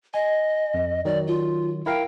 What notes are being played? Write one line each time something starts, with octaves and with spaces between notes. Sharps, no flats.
D#5 G#5
F2
D#3 F#3 D5
F4
E4 A#4 F5 G5